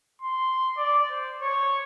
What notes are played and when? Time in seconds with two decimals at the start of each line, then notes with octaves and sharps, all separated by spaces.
0.22 C6
0.77 D5
1.09 C5
1.41 C#5